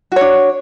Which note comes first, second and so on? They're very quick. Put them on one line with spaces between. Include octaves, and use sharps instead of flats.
F#4 C#5 D4